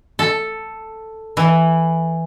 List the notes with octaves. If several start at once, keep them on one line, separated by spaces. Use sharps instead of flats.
A4
E3